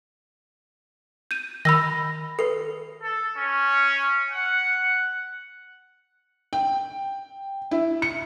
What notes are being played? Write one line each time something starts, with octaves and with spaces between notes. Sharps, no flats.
G6 D#7
D#3 B5 E6 A#6
A4 B4 C7
A4
C#4
F#5
G5
E4
C#7